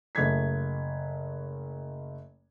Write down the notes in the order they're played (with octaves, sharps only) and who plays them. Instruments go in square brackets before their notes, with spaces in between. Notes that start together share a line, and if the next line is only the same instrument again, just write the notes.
[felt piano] F#1 A3 G#6 B6